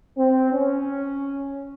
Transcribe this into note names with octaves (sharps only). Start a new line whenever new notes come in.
C4
C#4